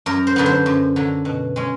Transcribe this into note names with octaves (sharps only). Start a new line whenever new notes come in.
F#2 A#4
C5
D3 F#3 B3
C5
F#2
D3 F#3
B2
G#3 C#4